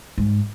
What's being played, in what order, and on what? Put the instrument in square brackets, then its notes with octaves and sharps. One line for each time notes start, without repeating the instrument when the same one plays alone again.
[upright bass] G#2